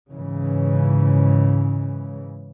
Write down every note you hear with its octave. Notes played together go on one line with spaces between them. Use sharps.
G#2 C#3 E3